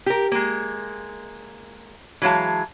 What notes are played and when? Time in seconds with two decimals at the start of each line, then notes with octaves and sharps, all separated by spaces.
0.06 G4 A#4
0.32 G#3 A#3
2.22 E3 F#3 G#3 F5 A5